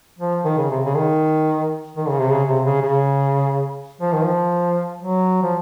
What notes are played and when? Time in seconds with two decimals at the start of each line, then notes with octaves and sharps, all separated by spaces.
0.19 F3
0.45 D#3
0.57 C#3
0.70 C3
0.85 C#3
0.96 D#3
1.97 D#3
2.08 C#3
2.19 C3
2.30 C#3
2.48 C3
2.66 C#3
2.82 C#3
4.01 F3
4.13 D#3
4.24 F3
5.02 F#3
5.42 F3